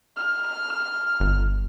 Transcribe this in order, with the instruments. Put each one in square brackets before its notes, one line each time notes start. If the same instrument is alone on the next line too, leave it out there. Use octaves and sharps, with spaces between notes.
[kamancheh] F6
[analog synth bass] G1